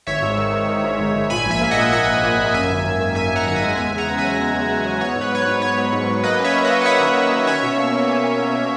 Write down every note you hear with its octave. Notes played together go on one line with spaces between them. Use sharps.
G#1 C#5 E5
G#2
D#3
D#3
D#3
G#2
G#1
G#1
A#2 G#5 B5
A#1
E5 G#5
A#3
D#5 F#5
A#2
A#2 D#5 F#5
A#3
A#2
A#3
F#2 E5 G#5
G#1
D#3
D#3
D#3 E5 G#5
F#2 F#5 A#5
G#1 F#5
G#3 E5 G#5
E2 E5 G#5
C#3
F#5 A#5
E2
E5 G#5
F#3
E2
E2
E2
F#3
B3 C#5
G#2
B4
F#3 C#5
B4
G#2
B3 C#5
F#3
G#2
F#3
A#3 B4 D#5
C#4 C#5 E5
A#3
B4 D#5
A#3
F#5
A#3 C#5 E5
D#3
A#3
D#3
C#4 C#5 E5
B2
A#3
A#3
C#4
C#4
B2
A#3